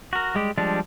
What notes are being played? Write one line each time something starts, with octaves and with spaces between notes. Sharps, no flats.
F#4 A#4
G3 G#3 G4
F3 G3 G#3 D4